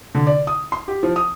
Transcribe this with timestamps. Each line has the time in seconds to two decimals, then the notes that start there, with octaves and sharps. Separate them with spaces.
0.15 D3
0.27 D5
0.47 D#6
0.72 C6
0.88 G4
1.03 F3
1.16 D#6